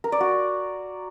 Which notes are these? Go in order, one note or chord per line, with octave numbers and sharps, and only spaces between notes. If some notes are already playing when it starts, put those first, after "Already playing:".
A#4
D5
F#4